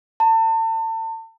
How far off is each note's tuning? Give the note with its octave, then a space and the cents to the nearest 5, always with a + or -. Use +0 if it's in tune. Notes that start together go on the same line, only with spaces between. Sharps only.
A5 +35